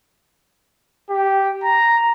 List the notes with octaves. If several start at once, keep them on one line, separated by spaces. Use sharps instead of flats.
G4
A#5